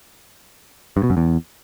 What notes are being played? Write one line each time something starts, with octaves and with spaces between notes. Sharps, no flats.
G2
B2
F#2
E2